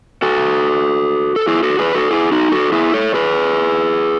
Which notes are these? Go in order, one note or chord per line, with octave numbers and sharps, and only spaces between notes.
F#4 A4
A4
E4 G#4
F#4 A4
G#4 B4
F#4 A4
E4 G#4
D#4 F#4
F#4 A4
E4 G#4
A4 C#5
G#4 B4